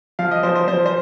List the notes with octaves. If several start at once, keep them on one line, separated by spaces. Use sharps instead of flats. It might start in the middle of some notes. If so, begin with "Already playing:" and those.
F3 F5
D#5
F3 C5
C5
F3 C5
C5